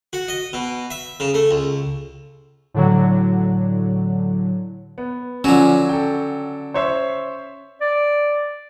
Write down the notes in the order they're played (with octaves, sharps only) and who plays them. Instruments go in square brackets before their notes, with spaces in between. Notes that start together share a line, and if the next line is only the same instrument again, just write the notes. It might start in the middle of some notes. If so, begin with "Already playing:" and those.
[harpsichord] F#4
D#5
B2
E5
C#3
A3
C#2
[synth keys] A2 D3 F#3
[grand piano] B3
[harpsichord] D3 F#3 [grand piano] F3 G#5 [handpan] C#4
[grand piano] A4 G5
C5 C#5 E5
[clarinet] D5